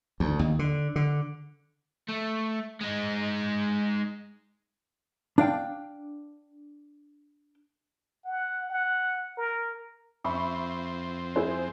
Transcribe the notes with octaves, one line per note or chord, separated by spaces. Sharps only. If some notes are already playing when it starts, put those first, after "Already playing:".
D2
D#2
D3
D3
A3
G#3 D#4
D4 F5 G5
F#5
F#5
A#4
F2 C4 E5 B5 C#6
E4 G#4 C5